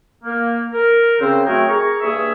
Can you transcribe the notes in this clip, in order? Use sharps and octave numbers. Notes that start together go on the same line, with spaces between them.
A#3
A#4
C#3 C4 C5
F#3 A3 C4 D#4 G#4 A#4
G#4 A#4 A#5 C#6
G2 A#3 G#4 C#5 E5